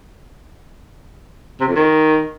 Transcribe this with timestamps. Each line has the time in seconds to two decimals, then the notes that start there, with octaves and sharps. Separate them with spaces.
1.60 C3
1.68 F2
1.75 D#3